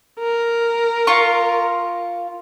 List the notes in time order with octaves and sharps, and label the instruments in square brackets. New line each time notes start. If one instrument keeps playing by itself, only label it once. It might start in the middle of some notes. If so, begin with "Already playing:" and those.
[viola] A#4
[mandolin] F4 C#6